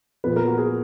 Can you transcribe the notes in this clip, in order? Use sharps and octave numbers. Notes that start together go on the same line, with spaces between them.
A#2 F3 B3 B4
A#4
F#4
G#4